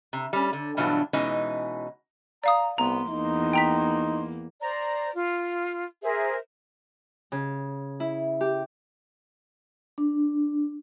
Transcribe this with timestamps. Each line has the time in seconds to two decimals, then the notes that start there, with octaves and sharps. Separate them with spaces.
0.13 C3
0.33 G3 C#4
0.53 D3
0.77 G2 B2 E3 F#3 D4 F4
1.13 B2 E3 G#3 C#4 D#4
2.44 D5 F5 A#5 D#6
2.78 C2 B3 A#5 C6
3.10 E2 A#3 D#4
3.53 G5 A#5 B6
4.61 C5 D5 A#5
5.15 F4
6.03 G#4 A#4 C5 E5
7.32 C#3
8.00 E4
8.41 G4
9.98 D4